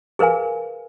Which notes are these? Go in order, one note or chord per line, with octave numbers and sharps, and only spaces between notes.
G#4 A#4 B4 F5 G#5